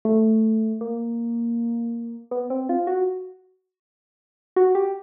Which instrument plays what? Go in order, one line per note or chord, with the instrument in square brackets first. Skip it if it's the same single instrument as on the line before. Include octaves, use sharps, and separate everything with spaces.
[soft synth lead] A3
A#3
B3
C4
F4
F#4
F#4
G4